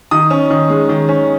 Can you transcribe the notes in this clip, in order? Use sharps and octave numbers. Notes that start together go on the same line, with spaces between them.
D#3 D#6
C#4
D#3
G#3
D#3
C#4